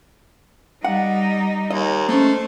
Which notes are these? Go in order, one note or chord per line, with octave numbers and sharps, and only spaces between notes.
G3 D#4 F#5
D#2 D#5
A3 A#3 C#4 C5